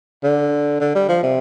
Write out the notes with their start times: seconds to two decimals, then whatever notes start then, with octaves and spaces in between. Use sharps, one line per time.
0.24 D3
0.81 D3
0.95 G3
1.09 F3
1.23 C3